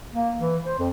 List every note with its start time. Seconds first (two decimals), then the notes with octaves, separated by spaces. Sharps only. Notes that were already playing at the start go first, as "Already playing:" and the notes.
0.13 A#3
0.39 E3
0.65 C5
0.79 F2